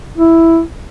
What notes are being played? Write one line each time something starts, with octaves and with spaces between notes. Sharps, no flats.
E4